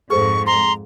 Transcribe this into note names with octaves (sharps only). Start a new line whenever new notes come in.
F2 G#2 G#4 A4 C5 C#6
A#5 C6